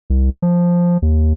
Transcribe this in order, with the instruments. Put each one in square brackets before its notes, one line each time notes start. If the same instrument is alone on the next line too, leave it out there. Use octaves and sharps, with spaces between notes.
[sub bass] C2
F3
D#2